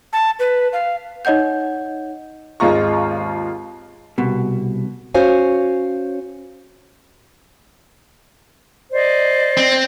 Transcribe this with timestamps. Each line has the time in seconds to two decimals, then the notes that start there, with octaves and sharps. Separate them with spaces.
0.13 A5
0.39 B4
0.73 F5
1.25 D#4 C#5 D#5 F#5 G6
2.60 G#1 D#2 G#3 F4 A#5 C#6
4.18 C2 B2
5.14 C#4 F#4 C5 C#5 F5 G#5
8.93 C5 D5 D#5
9.57 C4